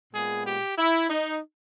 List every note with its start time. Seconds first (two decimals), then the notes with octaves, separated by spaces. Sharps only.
0.13 A#2 G#3 B3 G#4
0.45 G4
0.77 E4
1.09 D#4